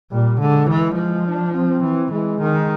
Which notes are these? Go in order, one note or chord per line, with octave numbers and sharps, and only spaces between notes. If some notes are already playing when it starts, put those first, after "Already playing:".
A#2 G3
D3 G#3
E3
F3
D4
C4
E3
E3 G#3
D#3